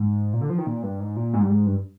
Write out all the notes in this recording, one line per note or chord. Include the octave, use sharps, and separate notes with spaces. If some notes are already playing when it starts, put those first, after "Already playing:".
Already playing: G#2
A#2
D3
F3
D#3
A#2
G2
G#2
A#2
G#2
G2
G#2
G2